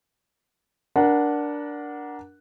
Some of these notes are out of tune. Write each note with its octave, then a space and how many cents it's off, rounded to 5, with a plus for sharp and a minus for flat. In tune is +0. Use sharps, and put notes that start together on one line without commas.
D4 -5 A#4 +20 F#5 +0